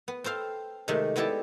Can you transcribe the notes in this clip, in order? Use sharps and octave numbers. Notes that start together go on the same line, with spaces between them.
B3
C4 A4 C5 F5
C3 D#3 G#3 A3
G#3 B3 E4 G4 A4 D5